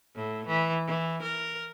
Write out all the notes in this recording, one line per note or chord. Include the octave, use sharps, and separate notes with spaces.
A2
E3
E3
A#4